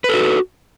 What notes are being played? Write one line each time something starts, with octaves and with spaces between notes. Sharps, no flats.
F#4 A4 B4